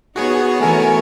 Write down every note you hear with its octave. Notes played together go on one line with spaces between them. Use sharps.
B3 D#4 F#4 G#4 C#5
E3 A3 F#4 A4 A#4 C#5 G#5